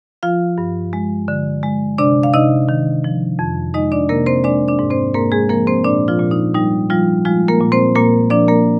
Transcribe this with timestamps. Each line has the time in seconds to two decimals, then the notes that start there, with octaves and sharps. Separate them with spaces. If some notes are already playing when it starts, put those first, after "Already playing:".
0.23 F3 F4 F5
0.58 G2
0.93 G#3
1.28 D3
1.63 G#3
1.98 C3 D4 D5
2.23 F5
2.34 C3 D#4 D#5
2.69 D#3
3.04 F3
3.39 F2
3.74 G#3 D#4 D#5
3.92 D4 D5
4.09 C3 A#3 A#4
4.26 C4 C5
4.44 G#3 D4 D5
4.68 D4 D5
4.79 G#2
4.91 C4 C5
5.14 G#2 A#3 A#4
5.32 G#3 G#4
5.49 F3 A#3 A#4
5.67 C4 C5
5.84 A#2 D4 D5
6.08 F3 F4
6.19 A#2
6.31 D#4
6.54 G3 D#4
6.90 F3 G3 F4
7.25 F3 G#3 F4
7.48 A#3 A#4
7.61 A#2
7.72 C4 C5
7.95 A#2 A#3 A#4
8.30 F3 D4 D5
8.48 A#3 A#4